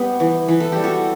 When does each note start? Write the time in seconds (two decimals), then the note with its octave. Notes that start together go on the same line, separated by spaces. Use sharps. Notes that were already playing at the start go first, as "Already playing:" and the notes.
Already playing: G3 B3 G4 B4
0.20 E3
0.48 E3 B4
0.60 A4
0.72 G3 G4
0.84 F#4 A4